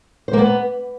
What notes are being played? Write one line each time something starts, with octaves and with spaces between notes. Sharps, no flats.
C5
A#3
B3